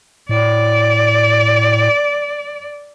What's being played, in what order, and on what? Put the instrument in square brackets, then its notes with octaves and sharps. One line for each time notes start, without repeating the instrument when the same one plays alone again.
[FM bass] A2 [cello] D5